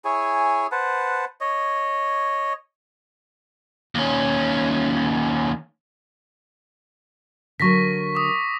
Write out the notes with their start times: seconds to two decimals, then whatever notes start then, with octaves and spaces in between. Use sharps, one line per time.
0.05 E4 G#4 C#5 G#5
0.72 B4 C5 F#5 A5
1.41 C#5 D#5
3.95 D#2 C#4
7.60 D3 F#3 A#4 C#6 A#6 B6
8.15 D6 D#6